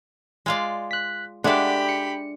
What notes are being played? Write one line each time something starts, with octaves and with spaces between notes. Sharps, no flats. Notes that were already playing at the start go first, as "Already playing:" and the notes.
G#3 F4 D5
F#6 B6
G#3 D4 G4 A4 D5 E5 F#5 B5
C#7